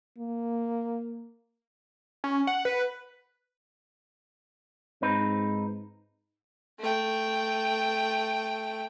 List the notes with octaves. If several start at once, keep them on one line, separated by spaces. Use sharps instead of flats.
A#3
C#4
F#5
B4
G#2 C4 D#4 B4
A3 G5